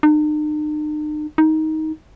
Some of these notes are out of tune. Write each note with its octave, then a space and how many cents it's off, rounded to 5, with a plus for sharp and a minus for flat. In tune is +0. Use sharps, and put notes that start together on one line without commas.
D#4 -45
D#4 +15